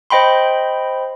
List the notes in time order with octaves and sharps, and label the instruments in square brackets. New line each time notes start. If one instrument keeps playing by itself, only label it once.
[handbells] C5 D#5 G5 B5 C6